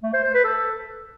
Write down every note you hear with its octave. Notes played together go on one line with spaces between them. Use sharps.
A3
C5
C5
B4
A4